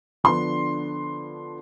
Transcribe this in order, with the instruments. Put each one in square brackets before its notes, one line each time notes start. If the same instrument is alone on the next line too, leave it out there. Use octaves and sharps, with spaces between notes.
[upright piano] D3 F3 B3 D4 C6